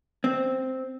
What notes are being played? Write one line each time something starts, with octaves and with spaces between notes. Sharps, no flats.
C4